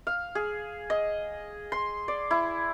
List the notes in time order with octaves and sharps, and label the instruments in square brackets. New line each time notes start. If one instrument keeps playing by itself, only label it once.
[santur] F5
G#4
D#5
C6
D5
E4